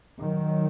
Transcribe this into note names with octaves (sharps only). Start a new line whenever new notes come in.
D#3 F#3